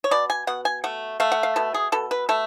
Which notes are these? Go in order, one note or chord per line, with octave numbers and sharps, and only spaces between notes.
C#5
B2 D5
G#5
B2 F#5
G#5
A3 F#5
A3 F5
F#5
F5
B2 A4
G#4
B2 A4
B4
A3 A4